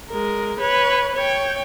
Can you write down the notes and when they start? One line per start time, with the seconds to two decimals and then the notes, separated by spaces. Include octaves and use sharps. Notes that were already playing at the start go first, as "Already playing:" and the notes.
0.11 G#3 A#4
0.60 B4 C#5
1.15 C#5 G5